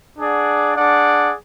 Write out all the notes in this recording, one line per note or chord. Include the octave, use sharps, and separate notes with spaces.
D4 G#4 D5 F#5
D4 G#4 D5 F#5